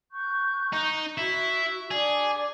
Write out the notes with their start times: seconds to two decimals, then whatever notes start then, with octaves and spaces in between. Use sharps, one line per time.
0.11 C#6 F#6 G6
0.73 D#4
1.18 E4 F#4
1.91 D4 G#4 D5 D6